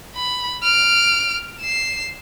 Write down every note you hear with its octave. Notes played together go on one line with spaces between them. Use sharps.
B5
F6 D7
C7 E7